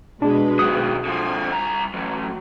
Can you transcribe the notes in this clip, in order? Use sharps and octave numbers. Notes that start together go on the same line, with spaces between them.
B2 G#3 D4 B4
D#3 F#3 D#6
D3 F3 G#5
C2 A#5
A2 E3 F#3